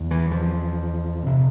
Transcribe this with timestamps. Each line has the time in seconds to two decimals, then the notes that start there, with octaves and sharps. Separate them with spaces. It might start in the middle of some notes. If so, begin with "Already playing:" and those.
Already playing: E2
0.11 E3
0.31 F3
1.26 C3